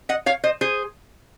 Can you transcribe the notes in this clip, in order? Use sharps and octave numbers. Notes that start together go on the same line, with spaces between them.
D#5 F#5
C#5 F5
C5 D#5
G#4 C5